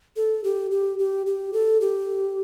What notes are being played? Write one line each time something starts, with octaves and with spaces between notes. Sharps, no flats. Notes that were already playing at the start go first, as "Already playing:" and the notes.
A4
G4
G4
G4
G4
A4
G4